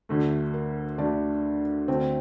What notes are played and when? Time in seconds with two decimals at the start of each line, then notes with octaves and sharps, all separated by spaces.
0.09 D2 D3 A3
0.54 A#4
0.98 D2 D3 A3 D4
1.88 D2 D3 A3 C4